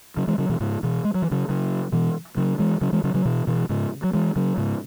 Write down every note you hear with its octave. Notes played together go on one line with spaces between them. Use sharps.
C#3 F#3
E3 G#3
C#3 F#3
B2 E3
G#2 C#3
B2 E3
G#3
F#3
E3
C#3 F#3
C#3 F#3
B2 E3
C#3 F#3
E3 G#3
C#3 F#3
E3 G#3
C#3 F#3
C#3 F#3
B2 E3
B2 E3
G#2 C#3
F#3
E3 G#3
C#3 F#3
G#2 C#3